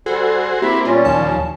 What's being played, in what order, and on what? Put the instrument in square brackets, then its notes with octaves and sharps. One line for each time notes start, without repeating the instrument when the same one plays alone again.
[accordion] G3 [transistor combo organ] F#4 G#4 C5 [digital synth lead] A4
[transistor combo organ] A#3 C4 [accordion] E4 E5 B5 [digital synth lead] G4
[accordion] A#2 G3 C#4 [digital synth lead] F4
[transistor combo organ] D#2 F3 [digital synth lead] A5